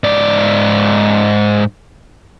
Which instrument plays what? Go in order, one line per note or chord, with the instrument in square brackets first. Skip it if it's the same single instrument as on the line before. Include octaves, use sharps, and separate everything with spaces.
[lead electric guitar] G#2 D5